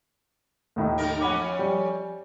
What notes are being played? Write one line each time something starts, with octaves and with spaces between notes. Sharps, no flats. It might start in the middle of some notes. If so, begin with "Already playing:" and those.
D#2 A2 D#3
D3 A#4
F2 C#4 F#5 B5 D6
G3